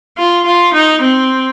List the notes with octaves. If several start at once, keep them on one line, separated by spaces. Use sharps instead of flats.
F4
F4
D#4
C4